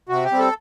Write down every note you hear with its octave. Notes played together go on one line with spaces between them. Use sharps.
C3 F#4
G4
G3 C4
A4